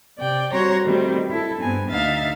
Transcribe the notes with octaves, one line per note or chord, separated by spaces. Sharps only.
C3 D5 G5
G3 C4 F#4 C#5 A#5 C6
B2 D#3 G3 A3 C4
E4 A4
G2 B3 C4 G#5
D2 D#4 E5 F5 A6